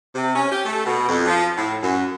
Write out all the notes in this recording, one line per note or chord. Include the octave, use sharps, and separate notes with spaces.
C3
C#4
G4
A3
B2
F2
F3
A2
F#2